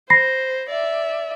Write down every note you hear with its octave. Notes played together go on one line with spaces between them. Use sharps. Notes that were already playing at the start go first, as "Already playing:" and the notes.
C5 B5 A#6 C7
D5 E5